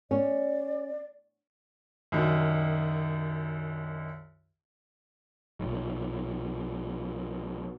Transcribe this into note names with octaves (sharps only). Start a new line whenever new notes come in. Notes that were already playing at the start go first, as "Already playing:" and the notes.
C#4 D5
C2 F#2 D#3
B1 A#2